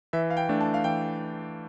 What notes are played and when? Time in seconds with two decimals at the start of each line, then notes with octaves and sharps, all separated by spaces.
0.13 E3 E5
0.30 F5
0.37 G5
0.49 A3 D4
0.61 A5
0.74 F5
0.84 E3 G5